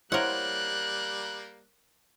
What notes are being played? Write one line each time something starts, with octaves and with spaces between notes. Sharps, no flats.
G3 A#3 E4 A#4 C5 C#5 F#5 F#6